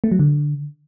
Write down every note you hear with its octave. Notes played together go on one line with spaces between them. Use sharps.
A3
F#3
D3